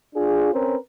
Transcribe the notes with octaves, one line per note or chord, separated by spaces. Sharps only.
D4 F4 G#4
C4 C#4 A#4 B4